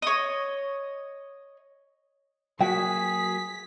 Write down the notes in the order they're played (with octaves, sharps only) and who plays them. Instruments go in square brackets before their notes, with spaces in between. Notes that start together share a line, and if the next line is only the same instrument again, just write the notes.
[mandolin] C#5 D#5
[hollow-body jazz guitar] F#3 A#3 F#4 [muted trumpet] G#4 [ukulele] G5 [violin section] B6